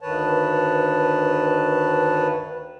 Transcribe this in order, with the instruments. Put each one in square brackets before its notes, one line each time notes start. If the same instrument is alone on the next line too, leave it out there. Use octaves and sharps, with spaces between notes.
[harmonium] D2 G2 D#3 B4 C#5 A5